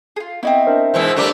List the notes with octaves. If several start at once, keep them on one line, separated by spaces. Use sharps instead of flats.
F4 G#4
B3 C4 D#4 E4 D#5
D4 A#4 C5
G#2 B2 E3 C5 E6
G2 G3 A3 D4 A#4 D5